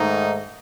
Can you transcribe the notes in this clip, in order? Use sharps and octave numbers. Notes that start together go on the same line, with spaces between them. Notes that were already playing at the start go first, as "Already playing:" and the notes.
Already playing: G#2 D#3 A3 D#4